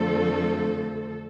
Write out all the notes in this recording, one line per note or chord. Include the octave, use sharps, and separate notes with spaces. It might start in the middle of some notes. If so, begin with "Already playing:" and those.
Already playing: F2 D3 F3 A3 A4